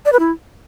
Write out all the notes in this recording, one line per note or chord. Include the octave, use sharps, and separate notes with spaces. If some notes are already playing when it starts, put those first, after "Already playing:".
D5
B4
E4